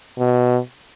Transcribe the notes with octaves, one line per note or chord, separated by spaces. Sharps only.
B2